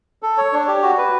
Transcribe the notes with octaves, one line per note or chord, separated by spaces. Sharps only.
A4
C#5
D4
G4
F#4
B4